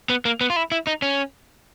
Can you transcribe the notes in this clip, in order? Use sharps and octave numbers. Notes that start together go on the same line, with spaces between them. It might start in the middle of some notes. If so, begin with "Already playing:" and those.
B3
A#3
B3
F4
E4
E4
D#4
C#4